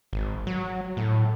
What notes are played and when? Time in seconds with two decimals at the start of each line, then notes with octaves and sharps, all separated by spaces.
0.13 G#1
0.47 F#3
0.97 A2